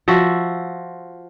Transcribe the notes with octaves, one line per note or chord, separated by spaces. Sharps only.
F3 F#4 E5